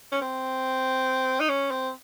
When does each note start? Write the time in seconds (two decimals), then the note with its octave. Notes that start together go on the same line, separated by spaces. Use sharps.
0.12 C#4
0.22 C4
1.40 D#4
1.49 C#4
1.71 C4